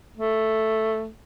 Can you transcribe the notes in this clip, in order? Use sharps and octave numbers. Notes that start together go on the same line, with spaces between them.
A3